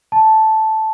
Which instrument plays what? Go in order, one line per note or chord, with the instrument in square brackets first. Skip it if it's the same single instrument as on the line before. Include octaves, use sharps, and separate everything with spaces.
[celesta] A5